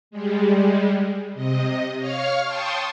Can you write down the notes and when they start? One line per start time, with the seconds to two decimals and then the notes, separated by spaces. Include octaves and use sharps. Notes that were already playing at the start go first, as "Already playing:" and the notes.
0.11 G3 G#3
1.34 C3 D#5
1.98 C#5 F5 C#6 F6
2.45 G5 A5 C6 C#6 D#6